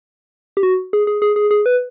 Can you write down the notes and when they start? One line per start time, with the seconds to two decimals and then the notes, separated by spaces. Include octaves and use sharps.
0.57 G4
0.63 F#4
0.93 G#4
1.07 G#4
1.22 G#4
1.36 G#4
1.51 G#4
1.66 B4